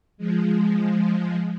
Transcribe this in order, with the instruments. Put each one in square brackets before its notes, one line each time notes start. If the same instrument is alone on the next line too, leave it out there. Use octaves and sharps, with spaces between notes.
[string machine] F3 G#3